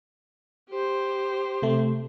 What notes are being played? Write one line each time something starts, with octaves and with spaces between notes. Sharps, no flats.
G4 C5
C3 A3